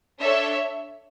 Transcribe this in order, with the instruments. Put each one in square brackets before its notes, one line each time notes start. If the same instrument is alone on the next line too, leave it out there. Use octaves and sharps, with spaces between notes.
[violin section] D4 A4 C#5 E5